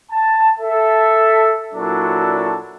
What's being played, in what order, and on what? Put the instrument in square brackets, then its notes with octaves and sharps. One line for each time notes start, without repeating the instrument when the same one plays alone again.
[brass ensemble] A5
A4 E5
A#2 F#3 D4 E4 F#4 A4